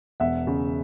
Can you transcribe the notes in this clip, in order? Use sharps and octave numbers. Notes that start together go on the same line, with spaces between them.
E1 E5 F#5
C#3